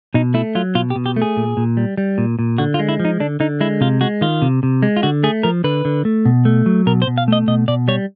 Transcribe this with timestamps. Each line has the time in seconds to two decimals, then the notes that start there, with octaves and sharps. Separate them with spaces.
0.14 B2 D#4
0.34 A3 E4
0.55 F#3 F4
0.75 B2 F4
0.90 G4
0.96 B2
1.06 G4
1.16 A3
1.22 G#4
1.37 A#2
1.57 A#2
1.77 G3
1.97 G3
2.18 A#2
2.39 A#2
2.58 D3 F#4
2.74 F4
2.79 G#3
2.89 E4
3.00 F3
3.05 D#4
3.20 D3 D4
3.40 D3 D#4
3.61 G#3 E4
3.81 C3 F4
4.01 G#3 F#4
4.21 D#3 F4
4.42 C3
4.63 C3
4.83 G#3
4.97 F4
5.03 D3 F#4
5.23 A3 G#4
5.43 F3 A#4
5.64 D3 B4
5.85 D3
6.05 A3
6.25 B2
6.45 A3
6.66 F#3
6.86 B2 A#4
7.02 C5
7.07 B2
7.18 F5
7.28 A3 D#5
7.48 B2 D#5
7.68 B2 D5
7.88 G3 C#5